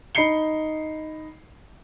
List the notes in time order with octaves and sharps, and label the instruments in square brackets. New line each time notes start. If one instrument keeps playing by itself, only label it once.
[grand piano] D#4 B5 C7 C#7 G7